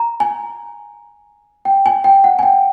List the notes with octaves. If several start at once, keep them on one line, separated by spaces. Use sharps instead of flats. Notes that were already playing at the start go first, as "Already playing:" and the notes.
Already playing: A#5
G#5
G5
G#5
G5
F#5
G#5
G5